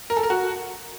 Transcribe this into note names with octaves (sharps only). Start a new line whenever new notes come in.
A#4
A4
A#4
F#4